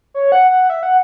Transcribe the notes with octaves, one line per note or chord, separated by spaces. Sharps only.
C#5
F#5
F#5
E5
F#5